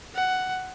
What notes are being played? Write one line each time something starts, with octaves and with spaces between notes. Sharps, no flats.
F#5